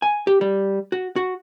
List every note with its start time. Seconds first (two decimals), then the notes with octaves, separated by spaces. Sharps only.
0.02 G#5
0.27 G4
0.41 G3
0.92 F#4
1.16 F#4